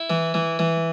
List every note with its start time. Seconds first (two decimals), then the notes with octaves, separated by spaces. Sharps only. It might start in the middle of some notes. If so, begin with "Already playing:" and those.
Already playing: E4
0.10 E3
0.34 E3
0.59 E3